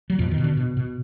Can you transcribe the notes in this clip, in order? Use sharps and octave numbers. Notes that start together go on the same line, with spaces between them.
F#3
F2 B2 F3
D#3
B2
D3
B2
B2